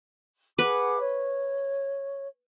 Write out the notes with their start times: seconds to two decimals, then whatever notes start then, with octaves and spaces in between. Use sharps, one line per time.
0.58 G#4 B4 F#5 D6
1.00 C#5